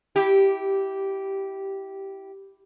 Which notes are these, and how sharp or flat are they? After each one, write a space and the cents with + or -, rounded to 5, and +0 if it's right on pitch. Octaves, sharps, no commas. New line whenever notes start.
E4 -10 G4 -10